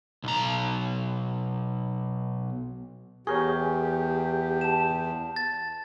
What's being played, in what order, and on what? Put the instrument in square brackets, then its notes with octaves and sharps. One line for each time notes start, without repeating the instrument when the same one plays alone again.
[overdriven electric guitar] B1 A#5
[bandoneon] E2 [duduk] G4 [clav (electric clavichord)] G#4 A#4 C#5 [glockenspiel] C#6
[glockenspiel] A5 E7
A6